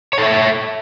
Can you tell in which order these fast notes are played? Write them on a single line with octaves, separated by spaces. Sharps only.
C#5 A4 E5